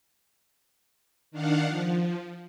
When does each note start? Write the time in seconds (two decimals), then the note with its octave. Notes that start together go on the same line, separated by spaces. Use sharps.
1.31 D#3 D4 F5 F#5
1.67 F3